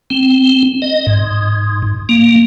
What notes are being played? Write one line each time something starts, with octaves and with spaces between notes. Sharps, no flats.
C4
D#5
G#2
A#3